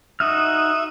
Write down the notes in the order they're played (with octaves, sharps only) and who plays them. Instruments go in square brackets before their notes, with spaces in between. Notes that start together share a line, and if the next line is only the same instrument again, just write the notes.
[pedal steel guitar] D#4 F#4 F6 [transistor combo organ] E5 D#6